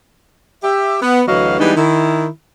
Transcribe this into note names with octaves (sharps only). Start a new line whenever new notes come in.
G4 E5
B3
D2 E3 F#3 F#4 D#5 F5
E3 G3 G#3 B3 D4 D#4
D#3 E4